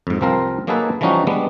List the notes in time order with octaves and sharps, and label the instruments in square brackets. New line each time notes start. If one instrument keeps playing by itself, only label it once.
[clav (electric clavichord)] F2 G#2
C2 F3 C4 A#4 F5
F#3 A#3 D#4 G#4 A4 B4
E3 F3 G3 C#4 D#4 F#4
G3 G#3 B3 D4